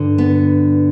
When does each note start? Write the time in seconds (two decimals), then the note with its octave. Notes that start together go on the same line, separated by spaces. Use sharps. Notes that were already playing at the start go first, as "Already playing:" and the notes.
Already playing: G2 D3
0.18 B3